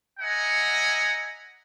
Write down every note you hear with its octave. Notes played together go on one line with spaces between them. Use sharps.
D#5 E5 F#5 G#5 A#5